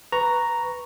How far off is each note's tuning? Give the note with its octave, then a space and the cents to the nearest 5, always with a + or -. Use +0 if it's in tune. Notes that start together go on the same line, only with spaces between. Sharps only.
B4 +0 A#5 +0 C#6 +0